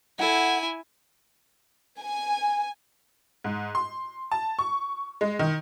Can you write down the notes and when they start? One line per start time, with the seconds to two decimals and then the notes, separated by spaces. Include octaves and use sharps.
0.19 E4 A4 F#5 G#5
2.02 G#5
3.44 G#2
3.75 C6
4.32 A5
4.59 C#6
5.21 G#3
5.39 D#3